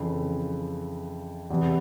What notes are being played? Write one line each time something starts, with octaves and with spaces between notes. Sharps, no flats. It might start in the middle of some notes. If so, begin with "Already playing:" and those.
Already playing: F2 C#3 E3
E2 C3 E3